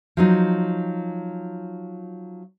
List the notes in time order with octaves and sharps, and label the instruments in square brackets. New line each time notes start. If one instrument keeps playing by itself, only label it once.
[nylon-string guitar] F3 F#3 D#4